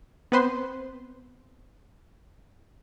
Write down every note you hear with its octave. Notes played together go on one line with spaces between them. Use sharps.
B3 C4 B4 C5 C6